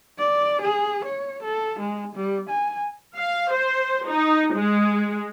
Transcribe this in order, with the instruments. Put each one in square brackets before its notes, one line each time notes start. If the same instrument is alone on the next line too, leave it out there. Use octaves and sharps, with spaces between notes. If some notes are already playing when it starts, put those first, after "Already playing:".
[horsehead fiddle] D5
G#4
C#5
A4
G#3
G3
G#5
[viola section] F5
C5
D#4
G#3